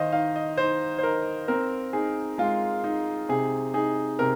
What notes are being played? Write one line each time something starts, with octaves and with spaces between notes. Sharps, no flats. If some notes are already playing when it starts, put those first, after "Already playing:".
Already playing: D#3 C5 D#5 F5
D#4 F5
D#5
D#4 C5
C5
D#4 A#4
C4 A#4
D#4 G#4
G#3 F4
D#4
C3 G#4
D#4 G#4
C3 A#4